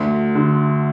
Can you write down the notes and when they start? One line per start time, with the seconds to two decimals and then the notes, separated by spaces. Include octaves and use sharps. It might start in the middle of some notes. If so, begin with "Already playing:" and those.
Already playing: D2
0.35 D3